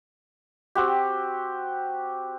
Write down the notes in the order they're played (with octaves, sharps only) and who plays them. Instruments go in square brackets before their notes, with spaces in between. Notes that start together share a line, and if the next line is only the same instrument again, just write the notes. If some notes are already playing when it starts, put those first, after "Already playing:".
[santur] C4 F#4 G4